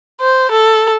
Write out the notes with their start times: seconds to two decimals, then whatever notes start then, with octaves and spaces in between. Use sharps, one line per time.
0.21 C5
0.51 A4